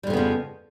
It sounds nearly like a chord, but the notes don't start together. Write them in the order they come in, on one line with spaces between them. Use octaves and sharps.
G3 F2 C#3 B3 F3